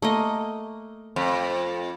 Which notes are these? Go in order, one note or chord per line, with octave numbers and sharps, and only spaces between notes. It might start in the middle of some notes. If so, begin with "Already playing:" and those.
A3 A#3 D#5
F2